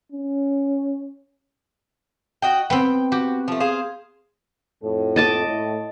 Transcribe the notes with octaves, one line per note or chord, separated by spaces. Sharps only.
C#4
F#4 D#5 G5
B3 C4 G5
F#4 G4
F3 A3
G#4 C5 F5
F2 A2 A4
D#5 A5 D6
A2